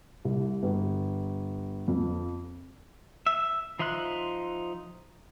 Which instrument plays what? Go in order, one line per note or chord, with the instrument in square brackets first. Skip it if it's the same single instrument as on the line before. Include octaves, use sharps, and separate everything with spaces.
[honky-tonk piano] C2
G1
F2
[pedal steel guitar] E5
F3 D#4 E5 C6 F#6